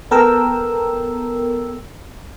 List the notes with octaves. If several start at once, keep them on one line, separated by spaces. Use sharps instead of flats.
B3 A4 A#4 G5 E6